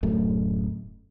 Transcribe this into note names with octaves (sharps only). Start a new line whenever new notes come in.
D1 F#2 A3